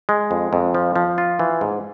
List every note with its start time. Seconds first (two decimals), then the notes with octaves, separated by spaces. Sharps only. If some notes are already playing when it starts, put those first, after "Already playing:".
0.09 G#3
0.31 F2
0.53 F2
0.75 F3
0.96 F3
1.18 F4
1.39 E3
1.61 G#2